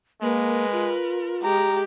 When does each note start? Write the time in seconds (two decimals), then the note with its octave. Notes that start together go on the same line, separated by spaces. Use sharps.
0.21 G#3 A#3 A#4 B4
0.72 F4
1.43 G#3 G4 A#5